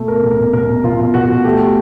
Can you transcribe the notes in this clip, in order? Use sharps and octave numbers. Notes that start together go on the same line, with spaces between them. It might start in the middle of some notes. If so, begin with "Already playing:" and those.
Already playing: B2 A3
A#4
B2
A#4
B2 A#4
B2 F4
B2 F#4
A3 G4